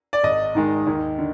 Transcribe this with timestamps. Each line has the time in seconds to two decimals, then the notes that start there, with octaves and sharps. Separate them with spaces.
0.13 D5
0.23 G#1 D#5
0.55 G#2 D#3 G#3
0.87 D#2
1.18 D3